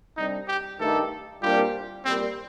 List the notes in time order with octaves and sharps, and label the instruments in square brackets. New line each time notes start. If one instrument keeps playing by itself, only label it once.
[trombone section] C2 C3 G3 D4 [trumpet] D#4
[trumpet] G4
[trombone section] G2 D#3 A3 D#4 G4 [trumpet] A4
[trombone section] C2 A#2 G3 D4 F4 [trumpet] G4
[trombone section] C2 A#2 G3 [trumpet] C4